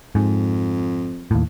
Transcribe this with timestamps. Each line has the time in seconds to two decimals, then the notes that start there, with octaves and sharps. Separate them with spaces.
0.15 F2 G#2
1.31 D#2 A2